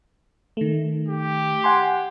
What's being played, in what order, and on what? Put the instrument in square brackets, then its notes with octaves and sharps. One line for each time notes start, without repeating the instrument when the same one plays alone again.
[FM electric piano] D#3 A3
[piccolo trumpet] G4
[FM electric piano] F#5 G#5 C6